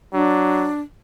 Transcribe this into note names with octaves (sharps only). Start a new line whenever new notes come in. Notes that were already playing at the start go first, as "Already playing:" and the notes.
F#3 D4